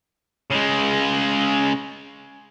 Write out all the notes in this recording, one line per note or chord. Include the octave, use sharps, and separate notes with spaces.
C#3 G#3